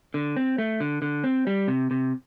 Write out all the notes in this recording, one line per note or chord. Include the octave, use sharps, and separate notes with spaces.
D3
C4
A3
D3
D3
C4
G3
C3
C3